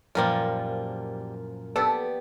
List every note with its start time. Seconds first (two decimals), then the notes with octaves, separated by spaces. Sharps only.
0.15 F#2 A#2 F3 G3 A#4 F5
1.76 B3 D4 G4 A4